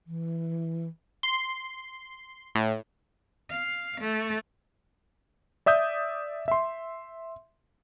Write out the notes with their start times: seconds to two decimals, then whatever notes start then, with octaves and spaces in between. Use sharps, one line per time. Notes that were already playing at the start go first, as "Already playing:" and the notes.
0.07 E3
1.23 C6
2.55 A2
3.50 F5
4.01 A3
5.66 D5 E5 D#6 G6
6.48 E5 C6